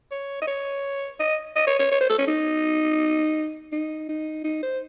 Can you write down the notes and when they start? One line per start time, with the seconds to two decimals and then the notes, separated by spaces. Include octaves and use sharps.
0.11 C#5
0.42 D#5
0.47 C#5
1.19 D#5
1.56 D#5
1.67 C#5
1.79 C#5
1.91 C#5
2.01 C5
2.09 A4
2.18 C#4
2.27 D#4
3.72 D#4
4.09 D#4
4.44 D#4
4.63 C5